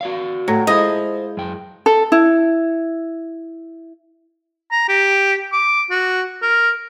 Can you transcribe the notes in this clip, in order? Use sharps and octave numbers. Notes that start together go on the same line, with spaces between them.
F#4 D5 F5
A2 F#3
G#3 E4 C5 D#5 F5
F#2 G5
A4
E4
A#5
G4
D6
F#4
A#4